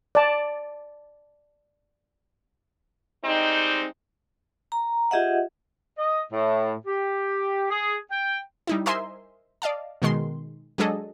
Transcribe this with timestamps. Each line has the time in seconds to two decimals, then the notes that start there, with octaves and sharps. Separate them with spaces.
0.15 D5 A5
3.24 G3 G#3 C4 D#4
4.72 A#5
5.11 F4 G4 G#4 D#5 E5 F#5
5.97 D#5
6.32 A2
6.86 G4
7.70 G#4
8.11 G5
8.67 G3 D#4 E4
8.86 A#4 C5 D#5 E5 G#5 C6
9.62 D5 D#5 F5 A5
10.02 B2 D#3 G#3 C6
10.78 F#3 G#3 D4 G#4 A4 D#5